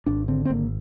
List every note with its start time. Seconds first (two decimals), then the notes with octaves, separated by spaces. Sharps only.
0.06 G#1 D4
0.28 D3 C4
0.45 C4
0.50 G#1 A#3